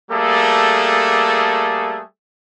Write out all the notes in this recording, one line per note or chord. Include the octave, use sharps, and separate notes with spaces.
G3 A3 A#3 G#4 A4